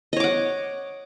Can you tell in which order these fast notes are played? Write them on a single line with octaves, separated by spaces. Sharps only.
D#5 C#5 D6 F#5